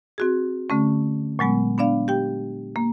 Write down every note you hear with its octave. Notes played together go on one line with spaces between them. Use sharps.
C4 F#4 G#4
D3 A3 C#4
A#2 F#3 G#3 B3
B3 D4 D5 F5
G4 G5
A#3